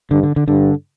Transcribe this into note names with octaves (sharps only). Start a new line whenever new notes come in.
G2 D3
D3
D3
G2 D3